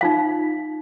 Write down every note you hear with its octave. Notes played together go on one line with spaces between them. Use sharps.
D#4 F4 F5